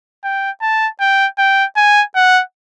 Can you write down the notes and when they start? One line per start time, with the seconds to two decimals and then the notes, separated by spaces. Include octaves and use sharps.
0.24 G5
0.62 A5
1.00 G5
1.38 G5
1.77 G#5
2.15 F#5